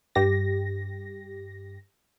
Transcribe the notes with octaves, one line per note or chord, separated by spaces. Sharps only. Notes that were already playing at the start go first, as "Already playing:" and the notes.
G2 G4 A#6